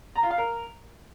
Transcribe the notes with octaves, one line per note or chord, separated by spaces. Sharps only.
A#5
F4
F5
A#4